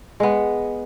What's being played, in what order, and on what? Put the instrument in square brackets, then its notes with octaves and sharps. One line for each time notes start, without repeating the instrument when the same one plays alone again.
[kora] G#3 B3